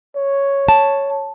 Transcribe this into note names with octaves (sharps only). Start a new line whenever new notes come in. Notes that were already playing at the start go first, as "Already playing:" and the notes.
C#5
A5